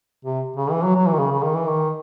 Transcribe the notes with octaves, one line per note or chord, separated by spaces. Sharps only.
C3
C#3
E3
F#3
F#3
E3
D#3
C#3
C#3
D#3
E3
D#3